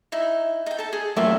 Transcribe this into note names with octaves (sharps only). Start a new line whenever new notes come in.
D#4 E4
D#4 G5
A4 A5
G#4
F#2 A3 A#3 D5 E5 A5